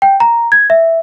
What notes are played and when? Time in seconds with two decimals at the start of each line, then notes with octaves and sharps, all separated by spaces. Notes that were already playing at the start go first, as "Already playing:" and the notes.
0.02 G5
0.20 A#5
0.52 G#6
0.70 E5